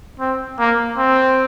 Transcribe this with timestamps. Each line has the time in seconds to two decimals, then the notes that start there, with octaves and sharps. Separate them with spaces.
0.20 C4
0.59 A#3
0.98 C4